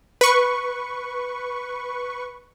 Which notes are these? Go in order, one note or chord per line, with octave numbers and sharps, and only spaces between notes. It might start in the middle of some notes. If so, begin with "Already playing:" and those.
B4 C#6